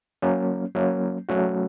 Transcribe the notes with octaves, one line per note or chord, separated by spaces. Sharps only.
F#3 A#3 C#4
F#3 A#3 C#4
F#3 A3 C#4 F#4